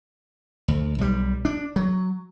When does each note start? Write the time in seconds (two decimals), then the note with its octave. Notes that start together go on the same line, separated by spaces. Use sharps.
0.68 D2
0.98 B1 G3
1.45 D4
1.76 F#3